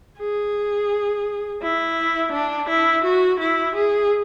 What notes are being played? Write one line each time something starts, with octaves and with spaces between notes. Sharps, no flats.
G#4
E4
D4
E4
F#4
E4
G#4